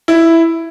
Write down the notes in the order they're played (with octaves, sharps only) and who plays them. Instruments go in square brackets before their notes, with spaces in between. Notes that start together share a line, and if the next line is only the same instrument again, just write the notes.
[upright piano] E4